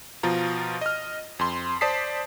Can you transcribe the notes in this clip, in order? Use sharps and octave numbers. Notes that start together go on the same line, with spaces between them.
B2 F3 F4 A#5
D#5 F6
F2 C6
C5 D5 A5 D#6 B6 C7